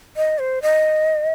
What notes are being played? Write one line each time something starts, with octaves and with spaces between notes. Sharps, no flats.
D#5
C5
D#5